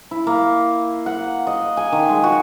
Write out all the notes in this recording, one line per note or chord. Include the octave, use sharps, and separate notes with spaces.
E4
A#3
F#5
D#5
G#5
D#3
G#3
F#4